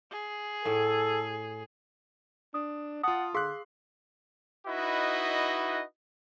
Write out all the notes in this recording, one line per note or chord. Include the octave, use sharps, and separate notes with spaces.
G#4
A2 A4
D4 D#6
F4 F#5 A5 D#6
D3 G#4 F5 C6 E6 F#6
D#4 E4 F#4 B4 D#5